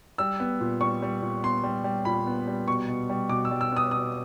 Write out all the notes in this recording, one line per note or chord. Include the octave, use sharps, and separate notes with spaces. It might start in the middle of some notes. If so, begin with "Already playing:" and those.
G3 E6
B3
A#2
G3 C#6
G3
A#2
B3 C6
G3
G3
A#2 B5
B3
G3
B2 C#6
B2
G3
B2 D6
E6
G3
E6
B3 D#6
B2 D#6